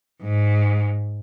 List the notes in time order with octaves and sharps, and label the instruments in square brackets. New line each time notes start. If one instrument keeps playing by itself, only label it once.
[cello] G#2